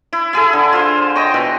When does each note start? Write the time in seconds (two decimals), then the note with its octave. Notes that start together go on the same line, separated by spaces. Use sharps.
0.13 E4
0.33 E4 G#4 A4
0.53 D3
0.73 F4 C5
1.15 D#5 G5 A#5 C#6
1.34 B2 E3